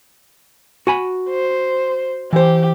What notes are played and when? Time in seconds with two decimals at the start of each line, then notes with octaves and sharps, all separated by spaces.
0.87 F#4 G#5 B5
1.30 C5
2.33 E3 G4 C5